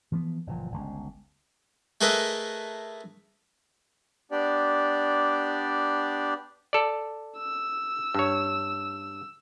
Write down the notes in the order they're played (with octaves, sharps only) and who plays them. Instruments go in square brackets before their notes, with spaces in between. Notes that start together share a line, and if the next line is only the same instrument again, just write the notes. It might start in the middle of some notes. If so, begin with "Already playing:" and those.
[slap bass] E3 F3 A3 B3
F#1 A#2 E3 F3
G1 C#2
[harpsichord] A3 G#4 A#4 B4 D#5 E5
[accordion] B3 D4 G4 D5
[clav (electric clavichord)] A4 D5
[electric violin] E6
[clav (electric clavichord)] G2 C#5